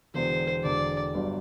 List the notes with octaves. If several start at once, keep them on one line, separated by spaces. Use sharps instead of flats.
E1 E2 D3 C5
E1 E2 D3 D5
G1 G2 F#3